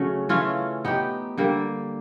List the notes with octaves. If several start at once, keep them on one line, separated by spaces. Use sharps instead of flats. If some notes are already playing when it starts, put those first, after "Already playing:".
Already playing: C#3 F#3 A3 C#4
E3 A3 C#4 F4
B3 D#4 G4
D3 G3 A#3